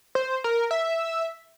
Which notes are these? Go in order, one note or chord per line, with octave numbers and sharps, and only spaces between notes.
C5
A#4
E5